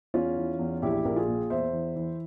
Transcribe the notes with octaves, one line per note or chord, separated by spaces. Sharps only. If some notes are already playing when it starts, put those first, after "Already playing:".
E2 C#4 F4
E3
E2
A#1 E4 G4
A#1 A#4
F4 G#4
A#2
E2 C5 E5
E3
E3